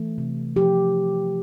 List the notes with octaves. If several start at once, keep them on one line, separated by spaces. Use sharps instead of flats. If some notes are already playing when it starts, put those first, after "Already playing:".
Already playing: E3 A3
C3
F3 G4